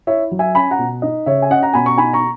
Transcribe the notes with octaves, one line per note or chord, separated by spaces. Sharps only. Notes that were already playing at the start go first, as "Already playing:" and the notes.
E4 C#5 E5
F#3
E5 G#5
C#4 G#5 B5
F#5 A#5
B2
D#4 D#5
C#3 C#5 E5
G#5
C#4 D#5 F#5
F#5 A#5
B2 G#5 B5
A#5 C#6
D#4 G#5 B5
A#5 C#6